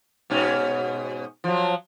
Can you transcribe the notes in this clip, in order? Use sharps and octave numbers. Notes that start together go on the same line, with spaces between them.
G#2 B2 C#4
F3 F#3